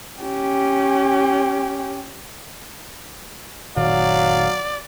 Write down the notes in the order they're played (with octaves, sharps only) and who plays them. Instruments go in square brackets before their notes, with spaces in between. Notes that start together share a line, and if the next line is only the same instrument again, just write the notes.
[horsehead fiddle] C#4 G4
[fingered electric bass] F#1 A#2 D#3 [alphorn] F#3 [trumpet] D5 [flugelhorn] F5